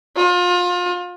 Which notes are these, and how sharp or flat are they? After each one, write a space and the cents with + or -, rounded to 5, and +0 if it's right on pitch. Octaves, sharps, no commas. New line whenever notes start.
F4 +30